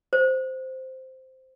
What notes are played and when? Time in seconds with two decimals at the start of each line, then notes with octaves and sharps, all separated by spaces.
0.13 C5